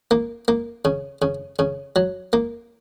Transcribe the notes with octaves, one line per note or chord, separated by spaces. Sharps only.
A#3
A#3
C#3
C#3
C#3
F#3
A#3